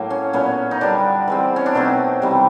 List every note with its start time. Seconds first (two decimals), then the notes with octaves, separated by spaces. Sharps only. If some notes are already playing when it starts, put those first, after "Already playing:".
Already playing: A2 F#3 A#3
0.10 C#4
0.33 A#2 F#3 B3 C#4
0.71 D#4
0.81 D3 G3 B3 D4
1.28 E3 G#3 C4
1.56 C#4
1.66 D4
1.75 B2 F#3 A3 C4 D#4
2.22 C3 E3 G3